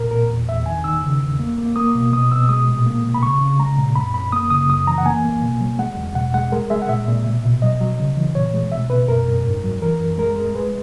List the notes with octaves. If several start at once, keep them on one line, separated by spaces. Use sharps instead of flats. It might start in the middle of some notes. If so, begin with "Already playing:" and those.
Already playing: A#2 A#4
A#2 A#4
E2
E2 E5
D#3 G#5
D#3 E6
C#3
E2
A#3
A#3
A#3 D#6
B2
B2 D#6
B2 E6
G#3 D#6
A#2
A#3
B2
B5
C#3 C#6
C#3
G#3 A#5
A#2
F#2 B5
F#2 B5
A#3 D#6
C#3 D#6
F#2 D#6
E3 A#5
F#5
A#3 G#5
A#3
B2
F#3
G#3 F#5
E2
B2 F#5
G#3 F#5
G#3 A#4
G#3 E5
F#5
A#2 E5
A#2
B2
B2
F#3 D#5
F#3
C#3
E3
A#2 C#5
G#3
B2 E5
B2 B4
F#2 A#4
F#2
G#2
F#3
E3 A#4
F#2
G#3 A#4
G#3
G#3 B4